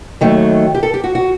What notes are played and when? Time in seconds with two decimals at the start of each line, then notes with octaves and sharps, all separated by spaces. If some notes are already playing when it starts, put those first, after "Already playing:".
0.21 D#2 D#3 F#3 A3
0.74 G4
0.83 A4
0.94 G4
1.04 F#4
1.15 F#4